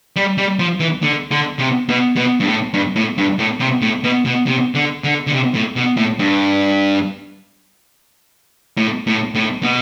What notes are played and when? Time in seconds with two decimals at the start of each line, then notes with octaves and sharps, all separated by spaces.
0.16 G3
0.38 G3
0.59 F3
0.80 E3
1.02 D3
1.31 D3
1.59 C3
1.89 B2
2.16 B2
2.40 G2
2.46 A2
2.74 G2
2.96 A2
3.18 G2
3.39 A2
3.60 C3
3.82 A2
4.04 B2
4.25 B2
4.47 C3
4.75 D3
5.04 D3
5.27 D3
5.32 C3
5.54 A2
5.76 B2
5.97 A2
6.19 G2
8.77 A2
9.07 A2
9.35 A2
9.63 B2